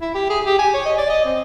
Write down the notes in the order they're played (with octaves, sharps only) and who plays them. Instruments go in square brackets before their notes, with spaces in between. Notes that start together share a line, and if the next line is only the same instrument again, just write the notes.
[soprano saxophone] E4
G4
G#4
G4
G#5
C#5
D#5
D5
D#5
C4